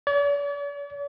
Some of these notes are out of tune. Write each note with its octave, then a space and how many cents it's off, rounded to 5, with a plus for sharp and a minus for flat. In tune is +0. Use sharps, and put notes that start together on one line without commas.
D5 -45